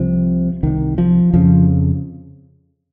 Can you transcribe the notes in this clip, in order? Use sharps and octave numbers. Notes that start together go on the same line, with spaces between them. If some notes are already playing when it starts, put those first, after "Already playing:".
Already playing: C2 C3 F3
C2 C3 D#3
F3
F2 C#3 F3